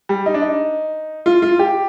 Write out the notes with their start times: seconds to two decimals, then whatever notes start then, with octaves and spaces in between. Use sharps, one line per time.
0.09 G3
0.26 D#4
0.34 D4
0.42 D#4
1.26 F4
1.42 F4
1.59 G4